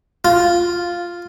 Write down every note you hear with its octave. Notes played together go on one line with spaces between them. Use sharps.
F4